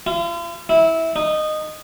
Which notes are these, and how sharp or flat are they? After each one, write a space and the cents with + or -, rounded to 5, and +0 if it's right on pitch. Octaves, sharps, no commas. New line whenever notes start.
F4 -45
E4 -15
D#4 -15